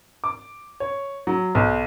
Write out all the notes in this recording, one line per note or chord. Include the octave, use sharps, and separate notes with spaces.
D6
C#5
F#3
B1